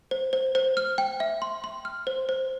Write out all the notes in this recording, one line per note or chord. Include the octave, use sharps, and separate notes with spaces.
C5
C5
C5
F6
G5
E5
C6
C6
F6
C5
C5